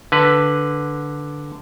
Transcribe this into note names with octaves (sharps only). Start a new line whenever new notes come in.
D3 B4